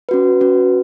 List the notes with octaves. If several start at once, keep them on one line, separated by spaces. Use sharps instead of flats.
C#4 F#4 B4
C#4 F#4 B4